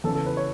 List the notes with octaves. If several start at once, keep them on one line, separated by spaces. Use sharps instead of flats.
E2 C#3 E3 A4
A4
B4
C#5